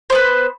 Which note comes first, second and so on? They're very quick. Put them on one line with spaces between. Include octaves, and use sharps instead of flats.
C5 B3 B4